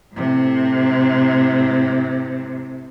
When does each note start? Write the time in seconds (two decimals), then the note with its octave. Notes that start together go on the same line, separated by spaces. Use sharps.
0.15 A2 C3